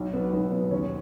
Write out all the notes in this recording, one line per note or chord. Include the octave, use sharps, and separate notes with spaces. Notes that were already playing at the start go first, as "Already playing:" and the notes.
Already playing: B1
B2 B3
B1
B2 B3
D#2 C#4